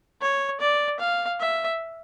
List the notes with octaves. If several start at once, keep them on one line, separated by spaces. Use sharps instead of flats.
C#5
D5
F5
E5